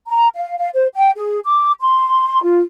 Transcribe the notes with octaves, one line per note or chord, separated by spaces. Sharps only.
A#5
F5
F5
C5
G5
G#4
D6
C6
F4